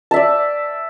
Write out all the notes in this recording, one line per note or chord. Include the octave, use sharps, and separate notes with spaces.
D5 E5 A5